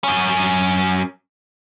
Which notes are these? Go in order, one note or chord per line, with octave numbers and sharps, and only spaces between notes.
F#2 C#4